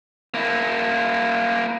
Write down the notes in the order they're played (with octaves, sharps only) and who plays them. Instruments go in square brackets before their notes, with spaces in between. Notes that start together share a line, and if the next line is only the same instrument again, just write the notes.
[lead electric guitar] A#3 E4